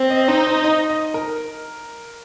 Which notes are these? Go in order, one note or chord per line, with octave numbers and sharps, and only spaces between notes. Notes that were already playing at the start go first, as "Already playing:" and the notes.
Already playing: C4
D#5
D#5
D#4 C5
C5
D#5
D#5
A#4